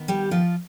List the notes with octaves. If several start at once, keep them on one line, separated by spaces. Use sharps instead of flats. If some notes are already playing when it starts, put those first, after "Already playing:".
Already playing: D#3 B3
G3 G4
F3 F4